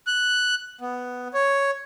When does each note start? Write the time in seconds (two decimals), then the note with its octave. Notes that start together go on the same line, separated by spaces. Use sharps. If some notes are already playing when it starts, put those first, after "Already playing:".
0.07 F#6
0.81 B3
1.34 C#5